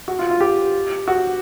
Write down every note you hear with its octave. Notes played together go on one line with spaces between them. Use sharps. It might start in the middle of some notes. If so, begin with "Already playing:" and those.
F#4
F4
F4
G4
F#4